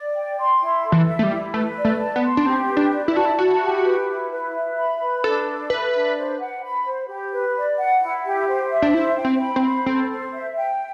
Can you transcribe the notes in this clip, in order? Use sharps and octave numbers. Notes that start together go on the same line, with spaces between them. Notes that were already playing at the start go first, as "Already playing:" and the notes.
Already playing: D5
G5
C6
E4
A4
E3
E5
A3
G3
E4
A3 B4
D5
A3
A5
B3
C6
D4
C4 G4
B4
D4
D5
E4
F#4 A5
E4
E4 F#4
G4
B4
E4
B4
E5
B5
B4
D4 A4
A4
B4 E5
D4
C5
F#5
B5
C5
G4
B4
D5
F#5
E4
G4
C5
E5
D4
E4 C5
G5
C4
B5
C4
C5
C4 A4
C5
E5
G5